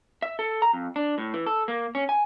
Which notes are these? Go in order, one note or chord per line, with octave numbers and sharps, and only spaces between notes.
E5
A4
A#5
F2
D4
A2
E3
A4
A#3
C#4
G#5